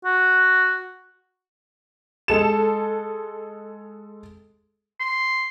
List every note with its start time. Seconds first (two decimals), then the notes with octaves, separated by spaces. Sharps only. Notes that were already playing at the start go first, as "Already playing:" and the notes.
0.05 F#4
2.28 G#3 A4 E7
5.00 C6